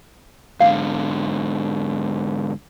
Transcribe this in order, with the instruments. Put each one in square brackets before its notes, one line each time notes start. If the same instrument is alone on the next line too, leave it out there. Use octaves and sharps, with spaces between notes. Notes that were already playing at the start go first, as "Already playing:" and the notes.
[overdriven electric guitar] G#2 D3 [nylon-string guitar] F5